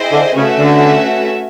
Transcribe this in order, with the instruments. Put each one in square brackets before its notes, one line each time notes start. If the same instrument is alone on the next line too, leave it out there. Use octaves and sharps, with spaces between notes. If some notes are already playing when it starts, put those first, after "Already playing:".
Already playing: [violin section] E4 G#4 C5 D#5 G5
[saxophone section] D3
[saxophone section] C#3 [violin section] A3 C#4 F#4 B4 E5
[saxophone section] D3